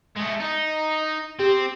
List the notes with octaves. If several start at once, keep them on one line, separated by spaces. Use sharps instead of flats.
G#3 A3
D#4
C4 G4